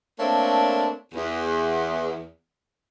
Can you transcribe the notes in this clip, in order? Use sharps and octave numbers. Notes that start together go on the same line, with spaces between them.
A3 A#3 C4 D4 A4 C#5
E2